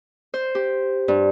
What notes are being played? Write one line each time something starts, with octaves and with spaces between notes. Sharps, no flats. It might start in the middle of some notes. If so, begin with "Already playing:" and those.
C5
G4
G2